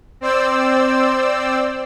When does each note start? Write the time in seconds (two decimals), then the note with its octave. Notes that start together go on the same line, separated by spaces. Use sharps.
0.21 C4 C5 D5 E6